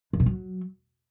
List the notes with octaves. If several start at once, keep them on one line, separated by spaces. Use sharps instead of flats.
F2
B2
F#3